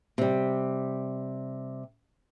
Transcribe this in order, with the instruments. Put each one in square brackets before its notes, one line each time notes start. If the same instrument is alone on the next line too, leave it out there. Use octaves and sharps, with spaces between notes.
[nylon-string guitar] C3 G3